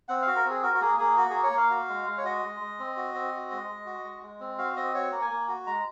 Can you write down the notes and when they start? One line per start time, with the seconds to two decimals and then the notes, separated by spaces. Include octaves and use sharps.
0.08 C4 F#5
0.22 F5
0.27 F#4
0.36 A#4
0.45 C4
0.50 G#4
0.63 F#4 A#4
0.75 F#4
0.81 A#3 G#4
0.98 A#3 G#4
1.17 F#4
1.30 A#3 G#4
1.43 C#5
1.52 A#3
1.57 F5
1.71 F#4
1.89 G#3
2.06 G#3
2.17 C#5
2.24 F#4 D#5
2.42 G#3
2.60 G#3
2.79 C4
2.97 F#4
3.14 C4
3.33 F#4
3.51 G#3
3.69 G#3
3.86 F#4
4.04 G#3
4.22 G#3
4.40 C4
4.58 F#4 F5
4.76 C4 D#5
4.94 F#4 C#5
5.12 A#3
5.22 G#5
5.30 A#3
5.48 F#4
5.66 G#3 A#5